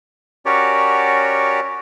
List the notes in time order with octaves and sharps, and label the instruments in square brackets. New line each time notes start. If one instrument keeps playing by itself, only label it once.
[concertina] C#4 F#4 G4 A#4 C#5 D5